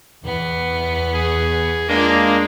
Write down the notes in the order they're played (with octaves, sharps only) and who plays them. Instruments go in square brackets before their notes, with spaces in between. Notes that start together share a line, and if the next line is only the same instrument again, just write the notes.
[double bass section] E2 [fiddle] B3
[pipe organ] G#4
[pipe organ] G#3 A#3 [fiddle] D4 F4